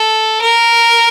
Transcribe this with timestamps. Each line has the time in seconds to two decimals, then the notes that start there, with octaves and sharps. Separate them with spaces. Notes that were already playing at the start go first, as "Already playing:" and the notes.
Already playing: A4
0.41 A#4